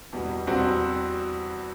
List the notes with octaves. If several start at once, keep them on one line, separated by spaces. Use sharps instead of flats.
E2 B2 G3
E2 B2 G3 C4 F#4